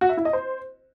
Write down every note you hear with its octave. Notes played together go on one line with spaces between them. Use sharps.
F#4
E5
E4
D#5
C5